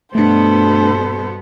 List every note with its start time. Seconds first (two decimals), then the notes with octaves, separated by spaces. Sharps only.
0.15 G2 B2 A3 B3 D4 A4 C5